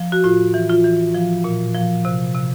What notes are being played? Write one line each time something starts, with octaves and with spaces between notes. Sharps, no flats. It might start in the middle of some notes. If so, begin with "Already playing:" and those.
Already playing: F3
F#4
A2 F4
E3
F4
E3
F3
A#2
F3
C3
C3